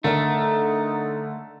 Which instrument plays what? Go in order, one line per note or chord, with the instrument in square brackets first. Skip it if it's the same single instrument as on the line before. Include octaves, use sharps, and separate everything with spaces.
[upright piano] D3 A#4 [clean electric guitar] A3 [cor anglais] D#4